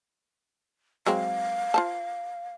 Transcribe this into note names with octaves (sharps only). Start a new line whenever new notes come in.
F#3 G#3 C4 F5
F4 C5 A5